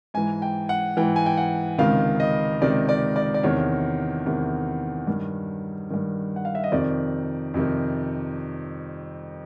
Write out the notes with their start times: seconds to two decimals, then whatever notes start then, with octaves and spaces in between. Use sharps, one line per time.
0.14 G#2 E3 G#5
0.42 G5
0.69 F#5
0.97 G#2 E3 G5
1.16 G#5
1.26 G5
1.37 F#5
1.78 C#2 C3 D#3 F5
2.20 D#5
2.62 C#2 C3 D#3 D5
2.89 D5
3.16 D5
3.34 D5
3.43 E2 C3 D#3 C#5
4.26 E2 C3 D#3
5.07 G2 D#3
5.90 G2 D#3
6.36 F#5
6.45 F5
6.55 E5
6.64 D#5
6.72 F2 C3 D#3 D5
7.54 F2 C3 D#3